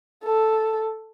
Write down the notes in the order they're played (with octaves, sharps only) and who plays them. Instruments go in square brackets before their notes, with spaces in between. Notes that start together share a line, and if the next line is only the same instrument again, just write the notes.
[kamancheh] A4